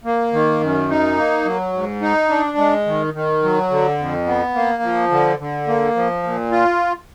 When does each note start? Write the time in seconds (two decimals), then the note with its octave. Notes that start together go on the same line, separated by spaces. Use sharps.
0.04 A#3
0.33 D#3
0.61 F#2
0.89 D#4
1.17 A#3
1.45 F#3
1.73 G#2
2.01 D#4
2.29 D4
2.58 G#3
2.86 D#3
3.14 D#3
3.43 F#3
3.70 D3
3.98 F2
4.26 B3
4.54 A#3
4.82 F3
5.11 D3
5.39 D3
5.67 A#3
5.95 F3
6.23 A#2
6.51 F4